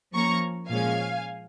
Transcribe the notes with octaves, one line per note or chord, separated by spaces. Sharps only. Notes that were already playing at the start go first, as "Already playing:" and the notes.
F3 A#3 C#4 A#5 C#6
A#2 F3 G#3 C#4 F5 G#5